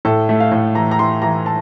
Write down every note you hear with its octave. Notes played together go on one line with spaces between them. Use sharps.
A2 A4
A3
F5
A2
E3 A#5
A#5
E3 C6
E3 A#5
A5